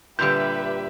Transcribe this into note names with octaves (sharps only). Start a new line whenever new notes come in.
A#2 D3 G3 G4 B4 E5 G6